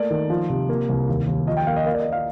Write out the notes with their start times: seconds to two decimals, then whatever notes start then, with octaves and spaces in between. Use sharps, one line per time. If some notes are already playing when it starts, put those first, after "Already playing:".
Already playing: A3 A#3 D5
0.11 D#3
0.30 F3
0.50 C3
0.69 A#3
0.89 C2
1.09 D#2
1.27 D#2
1.47 F3 D#5
1.57 G5
1.67 A#3 F5
1.76 D#5
1.86 A#3 F5
1.94 D5
2.00 D#5
2.06 A#3
2.13 F5